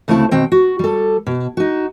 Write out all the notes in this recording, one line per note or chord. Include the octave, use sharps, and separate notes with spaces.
D2 C#3 A3 C4 E4 A5
B2 D#3 C4 G5
F#4
G3 A4
B2
D#4 F#4